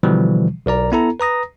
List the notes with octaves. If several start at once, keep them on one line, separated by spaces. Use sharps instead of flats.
B2 D3 E3 F3 G3
B1 A#4 D5 A#5
B3 E4 A4 A#5
B4 A#5 D#6 A#6